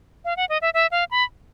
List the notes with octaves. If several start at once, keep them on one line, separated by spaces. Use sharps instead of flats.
F5
F#5
D#5
E5
E5
F5
B5